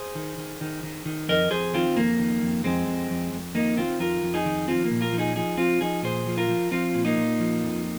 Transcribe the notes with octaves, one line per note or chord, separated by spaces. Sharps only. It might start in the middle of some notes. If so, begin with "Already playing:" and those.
Already playing: G#4 C5
D#3
D#3
D#3
D#3
D#3
F2 A#4 D#5
F2 G#4 C5
D#3 C4 F4
F2 A#3
D#3
F2
F2 G#3 C4
F2
F2
F2
D#3 A#3 D#4
D#3 C4 F4
F2 F4 A#4
F2
D#4 G#4
D#3
F3 C4 F4
A#3
A#2
F4 A#4
F3
D#4 G#4
F3 D#4 G#4
F3 C4 F4
F3 D#4 G#4
A#2 G#4 C5
F3
F4 A#4
F3
F3 C4 F4
A#2
A#3 D#4
A#2
F3
F2